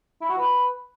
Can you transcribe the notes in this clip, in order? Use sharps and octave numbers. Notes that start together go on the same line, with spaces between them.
E4
F#4
B4